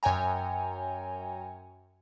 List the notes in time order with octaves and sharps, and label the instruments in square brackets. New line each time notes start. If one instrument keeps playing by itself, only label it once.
[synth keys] F#2 C#5 G5 G#5 A#5